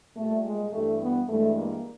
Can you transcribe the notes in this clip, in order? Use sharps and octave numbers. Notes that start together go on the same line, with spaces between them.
A#2 G3 A3
G#3
G2 E3 G3 A3
B3
G2 E3 G#3 A3
A#3